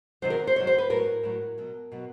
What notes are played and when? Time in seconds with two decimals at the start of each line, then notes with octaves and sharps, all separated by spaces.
0.22 C3 D#3 F#3 C5
0.30 A#4
0.47 C5
0.56 C3 D#3 F#3 C#5
0.67 C5
0.78 B4
0.90 A2 F#3 A#4
1.23 A2 F#3
1.58 B2 F#3
1.92 B2 F#3